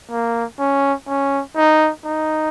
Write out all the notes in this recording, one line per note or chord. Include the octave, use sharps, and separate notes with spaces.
A#3
C#4
C#4
D#4
D#4